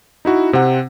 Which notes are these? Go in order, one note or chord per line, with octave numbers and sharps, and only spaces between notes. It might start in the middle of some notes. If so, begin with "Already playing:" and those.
D#4 E4 F#4
C3 C4 F#5